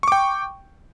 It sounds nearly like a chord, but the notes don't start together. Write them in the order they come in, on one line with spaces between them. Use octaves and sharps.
C#6 D6 G5